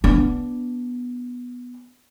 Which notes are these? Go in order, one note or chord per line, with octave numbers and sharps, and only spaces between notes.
B3 D4